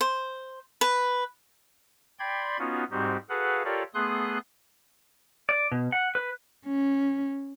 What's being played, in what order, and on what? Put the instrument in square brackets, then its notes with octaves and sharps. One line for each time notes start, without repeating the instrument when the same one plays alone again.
[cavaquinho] C5
B4
[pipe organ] D5 G5 B5 C6 G#6
B3 C#4 D#4 F4 F#4
G#2 G3 C4 D#4 F#4 G4
F#4 G#4 A4 B4 F5 F#5
F4 G4 A4 A#4 C#5 D5
A3 B3 G#4 C6 D#6 F#6
[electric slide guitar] D5
B2
F#5
B4
[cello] C#4